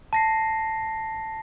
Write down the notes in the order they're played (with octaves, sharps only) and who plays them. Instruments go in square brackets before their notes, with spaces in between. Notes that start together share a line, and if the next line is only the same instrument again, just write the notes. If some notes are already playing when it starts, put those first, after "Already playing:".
[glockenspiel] A5 A#6 C7